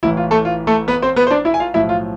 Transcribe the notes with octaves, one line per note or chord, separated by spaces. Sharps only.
A1 A2 E3 E4
F4
A3 A4
F4
A3 A4
B3 B4
C4 C5
B3 B4
C5
D4 D5
E4 E5
G#5
F4 F5
B1 A2 F3 E4 E5
F4